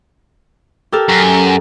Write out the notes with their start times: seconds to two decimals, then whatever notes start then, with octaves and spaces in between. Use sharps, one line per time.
0.92 G4 A4 A#4
1.09 F#2